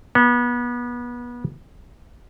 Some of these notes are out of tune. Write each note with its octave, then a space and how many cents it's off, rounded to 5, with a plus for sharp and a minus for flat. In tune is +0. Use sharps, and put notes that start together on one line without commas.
B3 -30